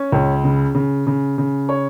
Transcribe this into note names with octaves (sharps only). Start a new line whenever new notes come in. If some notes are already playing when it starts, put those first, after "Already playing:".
Already playing: C#4
C#2
C#3
C#3
C#3
C#3
C#5